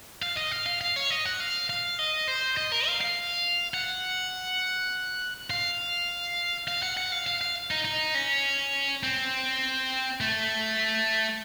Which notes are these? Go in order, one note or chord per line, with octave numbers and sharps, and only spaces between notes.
F5
D#5
F5
F5
F5
C#5
D#5
F#5
F5
F5
D#5
C5
D#5
A#4
F5
F5
F#5
F5
F5
F#5
F#5
F5
F5
F5
D#4
D#4
C#4
C4
A3